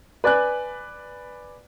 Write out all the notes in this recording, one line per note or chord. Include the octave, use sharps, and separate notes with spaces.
B4 D5 G#5 F#6